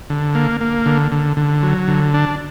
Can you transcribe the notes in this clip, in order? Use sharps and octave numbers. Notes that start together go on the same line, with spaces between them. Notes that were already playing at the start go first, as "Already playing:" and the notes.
D3
A#3
A#3
D3
D3
D3
F#3
D3
D4